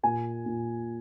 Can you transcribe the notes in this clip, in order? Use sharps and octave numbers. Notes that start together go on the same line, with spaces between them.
A#2 G#5
A#2